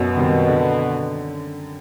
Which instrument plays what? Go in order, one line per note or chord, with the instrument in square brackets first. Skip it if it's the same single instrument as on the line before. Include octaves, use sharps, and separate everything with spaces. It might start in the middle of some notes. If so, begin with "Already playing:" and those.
Already playing: [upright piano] F#2 [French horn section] B2
[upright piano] D#3 G3 C4
D3